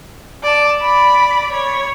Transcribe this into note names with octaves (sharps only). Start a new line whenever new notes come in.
D5 A5
D5 B5
C#5